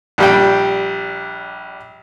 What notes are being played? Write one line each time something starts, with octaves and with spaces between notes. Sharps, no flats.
A#1 G3 G5